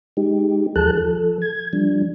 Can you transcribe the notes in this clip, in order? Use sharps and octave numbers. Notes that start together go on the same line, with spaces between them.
G#3 D#4 G4
D#2 F3 G#4 A4 A5 F#6
F3 A4
G#6
F3 G3 D4